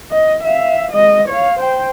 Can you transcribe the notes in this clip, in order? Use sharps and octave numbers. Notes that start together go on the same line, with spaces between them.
D#5
E5 F5
G#3 D#5
C#5 F5
C5 G5